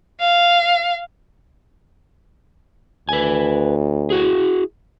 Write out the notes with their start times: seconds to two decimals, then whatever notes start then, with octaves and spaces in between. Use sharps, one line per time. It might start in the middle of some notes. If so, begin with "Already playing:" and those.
0.20 F5
3.09 D2 B4 G#5
4.10 E4 F#4 G#4